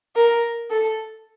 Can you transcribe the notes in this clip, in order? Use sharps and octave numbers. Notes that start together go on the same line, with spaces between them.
A#4
A4